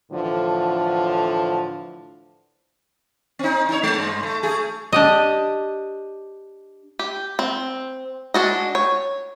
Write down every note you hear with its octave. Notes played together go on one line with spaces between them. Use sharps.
A2 D3 E3 F3
C4 D#4
D#4 C#5
G#3
G2
A3
A3 G#4
D4 G4 D#5
G4
C4
G#3 D4 F#4 D#5
C#5